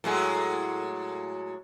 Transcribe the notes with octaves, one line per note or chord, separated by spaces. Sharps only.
A2 F#3 G#3